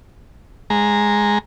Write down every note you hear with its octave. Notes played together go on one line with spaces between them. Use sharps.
G#3 A#5